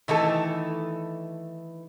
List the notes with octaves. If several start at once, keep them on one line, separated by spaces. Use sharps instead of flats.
D#3 E3 A3 A4